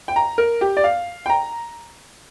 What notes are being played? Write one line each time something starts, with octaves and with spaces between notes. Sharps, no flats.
G5
A#5
A#4
G4
D5
F5
G5
A#5